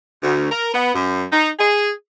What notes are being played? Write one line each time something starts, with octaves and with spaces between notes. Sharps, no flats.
D2
A#4
B3
F#2
D#4
G#4